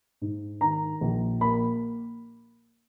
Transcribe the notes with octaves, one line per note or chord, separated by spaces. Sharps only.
G#2
D#3 A#5
A#1
A#3 B5